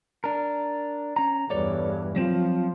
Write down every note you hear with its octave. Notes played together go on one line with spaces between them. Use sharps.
D4 A#4
C#4 A#5
E2 G2 A4 C#5 D5
F3 F#3 C4